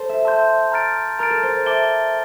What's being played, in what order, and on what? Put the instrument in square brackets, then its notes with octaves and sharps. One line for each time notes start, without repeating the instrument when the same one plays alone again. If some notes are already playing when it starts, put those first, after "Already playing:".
Already playing: [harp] A4 C5
E5
[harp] E5 [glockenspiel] A5 C6 G6
[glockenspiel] A#5 F6 A6 D7
[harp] A#4 [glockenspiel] A#5 F6 A6 D7
[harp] A4
C5
D5
[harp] E5 [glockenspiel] A5 D6 A6 D7 G7